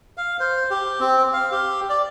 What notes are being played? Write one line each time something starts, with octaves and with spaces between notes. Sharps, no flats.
F5
C5
G4
C4
F5
G4
D5